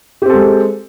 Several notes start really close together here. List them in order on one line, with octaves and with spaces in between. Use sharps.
G4 C4 A4 G#3